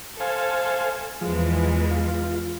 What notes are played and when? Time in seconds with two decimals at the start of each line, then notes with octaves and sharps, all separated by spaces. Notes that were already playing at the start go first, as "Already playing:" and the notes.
0.20 A4 C5 F5 G#5
1.21 E2 E3 F3 G#3
1.91 F4